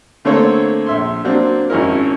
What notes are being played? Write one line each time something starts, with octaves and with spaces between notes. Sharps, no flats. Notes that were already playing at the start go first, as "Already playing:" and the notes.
D3 A3 A#3 C4 A4 C#5
A#1 E5 C6
F#3 A#3 C4 D4
G#1 C#4 E4 A#4